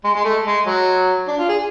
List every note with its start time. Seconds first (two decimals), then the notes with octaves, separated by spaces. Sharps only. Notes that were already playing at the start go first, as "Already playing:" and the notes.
0.04 G#3
0.15 G#3
0.24 A3
0.45 G#3
0.66 F#3
1.28 D4
1.38 F4
1.49 G#4